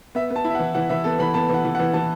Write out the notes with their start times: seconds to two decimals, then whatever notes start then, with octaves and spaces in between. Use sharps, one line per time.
0.15 B3 E5
0.30 B3
0.36 A5
0.45 E4
0.50 E5
0.55 F#5
0.59 E3
0.74 E3 F#5
0.89 E3 E5
1.04 B3 A4
1.19 E3 B5
1.34 B3 A5
1.49 E3 F#5
1.65 E3
1.75 F#5
1.79 E3
1.93 E3 A5